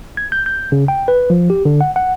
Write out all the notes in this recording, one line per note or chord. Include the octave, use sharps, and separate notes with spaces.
G#6
G6
G6
C#3
G5
B4
F3
G4
D3
F#5
F#5